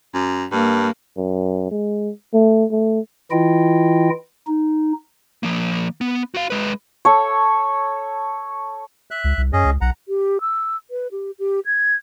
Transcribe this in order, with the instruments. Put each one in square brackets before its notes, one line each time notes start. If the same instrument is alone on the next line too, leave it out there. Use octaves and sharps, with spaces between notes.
[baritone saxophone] F#2
[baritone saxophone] G2 [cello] A#3
[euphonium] F#2
G#3
A3
A3
[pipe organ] E3 E4 F4 D#5 G5
D#4
[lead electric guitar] F3 A#3
B3
F#4 F5
G#3 B4
[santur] A4 C#5
[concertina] E5 F#6
[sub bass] C#2
C2
[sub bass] F#2 [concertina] C#4 G#4 D#5
[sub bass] C#2
[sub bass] B1 [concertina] F#5 A#5
[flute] G4
E6
B4
G4
G4
G#6